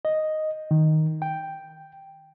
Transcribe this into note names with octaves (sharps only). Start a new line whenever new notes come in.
D#5
D#3
G5